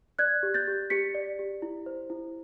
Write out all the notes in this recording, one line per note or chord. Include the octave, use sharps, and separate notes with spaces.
D5 F#6 G#6
G4
G6 A6
G4
G4 B6 C#7
D5
G4
E4
C5
E4